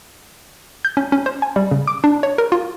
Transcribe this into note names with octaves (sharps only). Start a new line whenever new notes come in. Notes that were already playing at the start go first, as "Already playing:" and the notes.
G6
C#4
C#4
C5
G#5
G3
C#3
D6
D4
C#5
A#4
F4